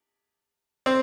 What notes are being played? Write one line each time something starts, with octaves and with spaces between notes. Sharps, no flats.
C4